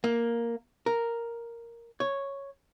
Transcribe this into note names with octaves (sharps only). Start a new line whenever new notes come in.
A#3
A#4
C#5